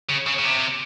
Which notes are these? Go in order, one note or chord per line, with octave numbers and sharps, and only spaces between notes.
C#3
C#3
C#3
C3